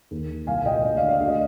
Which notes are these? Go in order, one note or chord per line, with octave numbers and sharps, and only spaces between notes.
D#2
D#3
C2 F5 G#5
G#5
A#2 D#5 G5
D2 D#5
D5 F5
D3
D5 F5
D2 F5
D#5